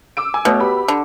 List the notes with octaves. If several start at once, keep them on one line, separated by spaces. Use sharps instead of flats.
D6 E6 D7
G#5
B2 A3 B3 C#5
G4 B5
D3